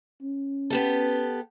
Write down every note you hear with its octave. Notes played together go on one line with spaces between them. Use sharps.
C#4
B3 G4 A4